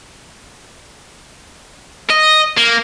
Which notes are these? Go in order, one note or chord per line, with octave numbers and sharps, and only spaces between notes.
D#5
A#3